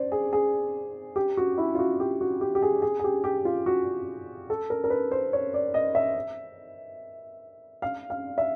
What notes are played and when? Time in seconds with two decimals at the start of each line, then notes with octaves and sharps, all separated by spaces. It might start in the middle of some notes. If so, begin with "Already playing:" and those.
Already playing: C5 D5
0.12 G#4
0.33 G#4
1.16 G4
1.37 F#4
1.58 E4
1.75 F4
1.79 F#4
2.00 G4
2.21 F#4
2.41 G4
2.55 G4
2.62 G#4
2.82 G#4
2.99 G#4
3.04 G4
3.24 G4
3.45 F4
3.66 F#4
4.50 A4
4.70 A#4
4.84 A#4
4.90 B4
5.11 C5
5.33 C#5
5.54 D5
5.74 D#5
5.95 E5
7.82 F5
8.10 F5
8.38 E5